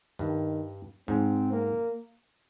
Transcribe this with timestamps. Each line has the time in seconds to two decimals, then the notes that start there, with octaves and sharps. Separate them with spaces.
0.19 G2 D#3
1.08 G#2 C4
1.52 A#3